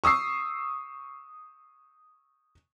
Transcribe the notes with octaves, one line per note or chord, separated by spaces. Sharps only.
C#6 D#6 E6 C7